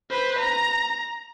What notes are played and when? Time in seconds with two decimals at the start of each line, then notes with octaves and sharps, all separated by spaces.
0.10 B4 C5
0.39 A#5